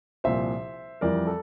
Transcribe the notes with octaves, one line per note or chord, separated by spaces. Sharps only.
C2 A#2 F3 C5 E5
F2 E3 G3 A#4 D5
A4